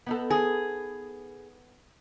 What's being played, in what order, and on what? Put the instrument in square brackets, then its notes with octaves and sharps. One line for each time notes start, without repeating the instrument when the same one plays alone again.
[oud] B3 D#4 A4
[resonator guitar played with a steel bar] G#4